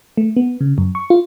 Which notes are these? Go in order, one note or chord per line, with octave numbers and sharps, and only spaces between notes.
A3
B3
C#3
F#2
C#6
F4